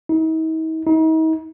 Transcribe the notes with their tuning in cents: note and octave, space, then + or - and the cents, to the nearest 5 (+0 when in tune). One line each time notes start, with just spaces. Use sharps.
D#4 +45
D#4 +40